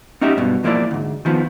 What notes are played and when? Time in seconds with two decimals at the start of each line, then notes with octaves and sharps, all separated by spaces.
0.21 C#4 D#4 F#4 G4 E5
0.37 B1 G2 B2
0.63 G#2 F3 A#3 D#4 E4 D5
0.91 D2 G#2
1.25 D#3 F3 B3